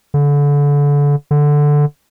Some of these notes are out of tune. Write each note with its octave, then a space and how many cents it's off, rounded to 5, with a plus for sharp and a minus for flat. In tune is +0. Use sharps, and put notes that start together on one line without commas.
D3 -30
D3 +0